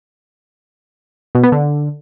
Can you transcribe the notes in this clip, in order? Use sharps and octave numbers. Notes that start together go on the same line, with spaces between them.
B2
B3
D3